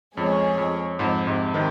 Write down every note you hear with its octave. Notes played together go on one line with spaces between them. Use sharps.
F2 G#3 C#4 G#4 C#5
F2
F2 G#2
G#2 C3
C3 D#3